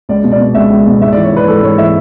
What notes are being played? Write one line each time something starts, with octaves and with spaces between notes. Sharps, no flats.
C#2 D5
B2
D5
B2
C#2 E5
C#2
B2
G#2 E5
E3 D5
C#5
E3 B4
G#2 A4
G#2 C#5
E3 E5